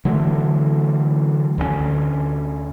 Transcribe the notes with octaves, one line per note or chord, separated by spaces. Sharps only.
D3 E3 F#3 A3
D2 D3 F#3 C#4